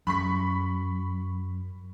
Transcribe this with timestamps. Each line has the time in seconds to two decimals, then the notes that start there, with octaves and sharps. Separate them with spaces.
0.07 F#2 B5 C#6 B6